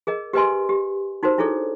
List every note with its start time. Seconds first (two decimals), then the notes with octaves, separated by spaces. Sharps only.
0.07 G#4 A#4 D#5
0.33 G4 A#4 B4 D#5 G#5 C6
0.69 G4
1.23 D#4 F#4 A#4 C5
1.38 D4 E4 G#4 A4 C#5 D5